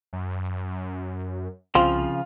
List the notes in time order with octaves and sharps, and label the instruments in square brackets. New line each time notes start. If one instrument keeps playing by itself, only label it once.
[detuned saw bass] F#2
[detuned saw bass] C2 [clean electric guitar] C#3 F3 [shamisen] C4 [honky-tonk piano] F4 F7